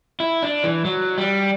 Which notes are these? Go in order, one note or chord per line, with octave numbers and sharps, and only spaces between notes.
E4
D4
E3
F#3
G3